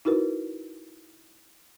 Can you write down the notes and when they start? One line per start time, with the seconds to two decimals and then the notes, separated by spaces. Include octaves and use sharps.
0.05 D#4 E4 F#4 A#4 B4